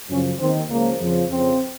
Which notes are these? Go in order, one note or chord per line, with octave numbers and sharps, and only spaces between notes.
F#2 C#3 F3 C#4
D#2 D#3 C4
C#2 C#3 F3 A#3
F2 C#3 F3
F2 C#3 F3 C4